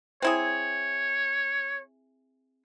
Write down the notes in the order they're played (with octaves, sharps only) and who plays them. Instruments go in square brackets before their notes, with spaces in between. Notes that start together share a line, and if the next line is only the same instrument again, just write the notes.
[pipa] C4 E4 G#4 [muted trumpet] C#5